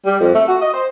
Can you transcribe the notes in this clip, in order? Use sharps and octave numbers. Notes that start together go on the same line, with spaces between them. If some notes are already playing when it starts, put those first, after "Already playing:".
G3
F2
A3
F#4
D#5
C5